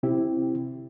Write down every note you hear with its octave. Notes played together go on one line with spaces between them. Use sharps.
C3 C4 E4 G4